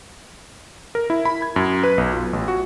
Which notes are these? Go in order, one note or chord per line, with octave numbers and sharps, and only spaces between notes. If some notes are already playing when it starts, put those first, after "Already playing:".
A#4
E4
B5
G#6
F#2
B4
B1
F4
A1
F#4